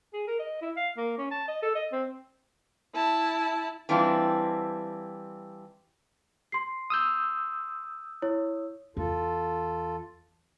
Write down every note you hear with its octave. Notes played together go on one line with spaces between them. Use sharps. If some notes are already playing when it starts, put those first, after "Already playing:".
G#4
A#4
D#5
E4
F5
A#3
C#4
A5
D#5
A4
D#5
C4
E4 A5
E3 G3 C4 D4 E4 F4
C6 C7
D#6 E6 G6
E4 C#5
E2 F4 A4